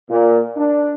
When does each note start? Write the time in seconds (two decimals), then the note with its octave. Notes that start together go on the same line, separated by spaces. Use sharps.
0.10 A#2
0.57 D4